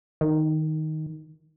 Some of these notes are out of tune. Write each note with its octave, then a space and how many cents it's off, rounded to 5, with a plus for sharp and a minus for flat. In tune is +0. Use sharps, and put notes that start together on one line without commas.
D#3 +5